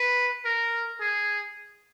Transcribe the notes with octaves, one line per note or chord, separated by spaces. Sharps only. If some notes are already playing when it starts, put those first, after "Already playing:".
Already playing: B4
A#4
G#4